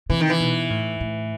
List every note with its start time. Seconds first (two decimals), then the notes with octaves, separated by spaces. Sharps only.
0.10 C3 E3
0.20 D#3
0.30 E3
0.40 B2
0.70 A2
1.01 A2